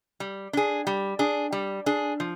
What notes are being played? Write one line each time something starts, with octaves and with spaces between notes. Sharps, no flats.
G3
D4 G#4
G3
D4 G#4
G3
D4 G#4
F3